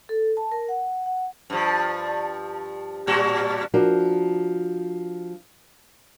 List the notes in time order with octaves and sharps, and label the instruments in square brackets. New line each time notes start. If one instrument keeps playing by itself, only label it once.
[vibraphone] A4
A5
A#4
F#5
F#5
[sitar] G2 F3
A2 G3 F#4
[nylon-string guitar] F3 D4 F#4 A#4